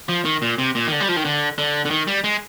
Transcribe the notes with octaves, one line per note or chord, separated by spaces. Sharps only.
F3
D#3
A#2
C3
A#2
D#3
D3
G3
F3
D#3
D3
D3
D3
D#3
G3
G#3